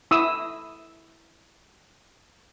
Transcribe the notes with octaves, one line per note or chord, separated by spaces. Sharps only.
E4 D#6 E6